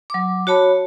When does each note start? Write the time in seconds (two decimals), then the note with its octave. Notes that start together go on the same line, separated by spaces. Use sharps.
0.10 F#3 D6
0.47 F#4 C#5 A5 B5